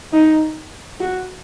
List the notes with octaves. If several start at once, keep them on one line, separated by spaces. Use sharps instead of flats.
D#4
F#4